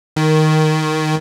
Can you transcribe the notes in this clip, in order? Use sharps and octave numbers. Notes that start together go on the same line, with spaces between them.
D#3